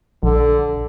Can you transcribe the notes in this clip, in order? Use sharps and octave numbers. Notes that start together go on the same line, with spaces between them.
A#1 D3